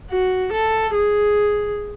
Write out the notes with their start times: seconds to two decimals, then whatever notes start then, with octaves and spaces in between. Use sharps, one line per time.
0.11 F#4
0.53 A4
0.94 G#4